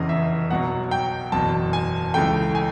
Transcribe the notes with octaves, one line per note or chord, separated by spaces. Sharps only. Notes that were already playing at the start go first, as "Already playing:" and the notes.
Already playing: F1 E2 C#3 E3 D#5
E5
B1 B2 F#3 F#5
G5
F#1 E2 B2 A5
G#5
C#2 C#3 E3 A3 G5
G#5